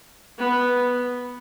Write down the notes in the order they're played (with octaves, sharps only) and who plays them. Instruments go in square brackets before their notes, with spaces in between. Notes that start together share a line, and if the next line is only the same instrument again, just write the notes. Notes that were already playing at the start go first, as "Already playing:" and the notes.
[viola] B3